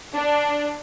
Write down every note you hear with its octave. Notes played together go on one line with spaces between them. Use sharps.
D4